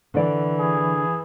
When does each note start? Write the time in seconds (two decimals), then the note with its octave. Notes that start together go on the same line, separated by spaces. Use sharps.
0.14 D3 E3 D5
0.60 G#4